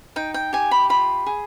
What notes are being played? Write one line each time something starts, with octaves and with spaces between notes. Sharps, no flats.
D#4 G5
G5
G4 G#5
B5
F4 B5
G#4